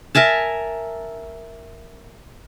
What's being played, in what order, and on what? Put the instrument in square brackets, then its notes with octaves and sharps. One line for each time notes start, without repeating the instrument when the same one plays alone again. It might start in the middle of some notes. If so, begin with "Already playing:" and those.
[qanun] A#4 E5 G#5 A5